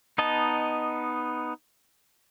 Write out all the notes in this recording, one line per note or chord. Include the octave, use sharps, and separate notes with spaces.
B3 D#4 D#5 A5